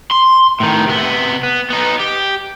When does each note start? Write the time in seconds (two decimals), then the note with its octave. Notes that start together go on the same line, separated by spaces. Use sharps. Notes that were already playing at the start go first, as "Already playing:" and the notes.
0.11 C6
0.60 A2 D#3
0.87 C3 B3
1.43 B3
1.70 B3 D#4
1.99 G4